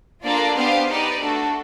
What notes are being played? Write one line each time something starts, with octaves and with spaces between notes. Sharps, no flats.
A#3 D4 F4 A4 D5
B3 D4 G4 C5 F5
D#4 G4 B4 D5
A3 D4 F#4 A4